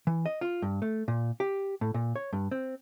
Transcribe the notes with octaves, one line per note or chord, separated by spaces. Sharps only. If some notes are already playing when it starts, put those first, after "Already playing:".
E3
D#5
F4
G2
A3
A#2
G4
A2
A#2
C#5
G2
C4